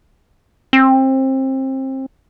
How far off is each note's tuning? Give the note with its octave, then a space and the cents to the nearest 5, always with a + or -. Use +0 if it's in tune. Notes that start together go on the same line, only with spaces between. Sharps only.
C4 +25